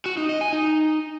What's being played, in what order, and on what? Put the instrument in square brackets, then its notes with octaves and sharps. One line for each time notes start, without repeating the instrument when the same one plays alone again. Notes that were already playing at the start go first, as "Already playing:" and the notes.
[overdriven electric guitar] F#4
D#4
D#5
G#5
D#4